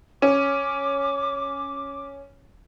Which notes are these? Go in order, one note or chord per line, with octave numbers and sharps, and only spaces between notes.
C#4 D6